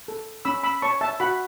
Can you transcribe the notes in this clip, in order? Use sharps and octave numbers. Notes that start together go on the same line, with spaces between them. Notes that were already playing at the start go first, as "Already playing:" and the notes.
A4
C#4 B5 E6
B5 E6
C#5 A5 C#6
E5 A5
F#4 F#5 B5